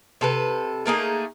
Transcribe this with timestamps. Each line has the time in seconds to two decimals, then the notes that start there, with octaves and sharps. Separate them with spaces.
0.21 C3 A4 B4
0.86 A3 A#3 D#4 G#4